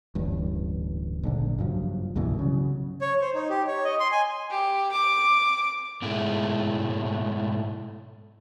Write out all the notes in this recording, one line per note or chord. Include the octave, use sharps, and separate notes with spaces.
D1 A1 G2
A#1 D3
F#1 G2 F3 F#3
C2 G2 B2 E3
C#3 F#3
C#5
C5
D#4
G4
C#5
D#5
C6
G#5
G4
D6
G#2 B2 G#3 A3 E4